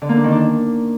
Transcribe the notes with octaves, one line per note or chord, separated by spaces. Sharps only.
D3
A#3
D4
D#3
D4